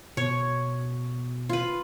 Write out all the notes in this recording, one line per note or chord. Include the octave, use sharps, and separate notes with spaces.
B2 C#5
F4 B4